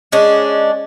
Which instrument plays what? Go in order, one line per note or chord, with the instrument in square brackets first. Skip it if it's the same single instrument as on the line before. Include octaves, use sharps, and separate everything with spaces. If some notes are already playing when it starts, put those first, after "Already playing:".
[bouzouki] G#3 C#4 D4